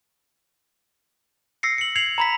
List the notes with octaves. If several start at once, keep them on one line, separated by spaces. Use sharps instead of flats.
E6 A#6 C7 C#7
C#7 F#7
G#6 C7 C#7 F7 F#7
A#5 B5 B6